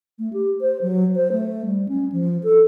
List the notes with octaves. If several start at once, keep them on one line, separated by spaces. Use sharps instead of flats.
A3
G4
C5
F#3
C5
A3
G3
C#4
F3
A4